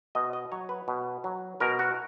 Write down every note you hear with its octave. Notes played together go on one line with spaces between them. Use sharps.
B2 D#5
D#5
F#3 C#5
B4
B2
F#3
B2 A#4
F#4